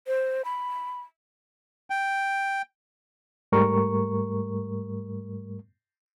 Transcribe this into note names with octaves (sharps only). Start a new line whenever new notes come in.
C5
B5
G5
G#2 G3 A3 A#4 C#6